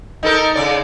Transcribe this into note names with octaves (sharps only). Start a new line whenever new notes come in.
D#4 A4 A#4
C#3 D5